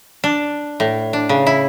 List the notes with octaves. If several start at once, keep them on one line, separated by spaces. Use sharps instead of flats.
D4
A2
D4
C#3
E4